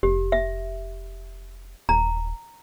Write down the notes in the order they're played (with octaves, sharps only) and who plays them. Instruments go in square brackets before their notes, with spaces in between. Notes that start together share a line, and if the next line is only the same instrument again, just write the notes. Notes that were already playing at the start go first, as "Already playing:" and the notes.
[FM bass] F1 [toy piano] G4
[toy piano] E5
[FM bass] D#1 [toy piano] A#5